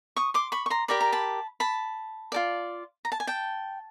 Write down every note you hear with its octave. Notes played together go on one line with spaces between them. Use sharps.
C#6 D#6
C6 D6
B5 C#6
C#6
A#5 C6
G4 A#4 D5 B5
A#5
A5 B5
A5 B5
F4 A4 D5
A#5
A5
G#5
G5 A5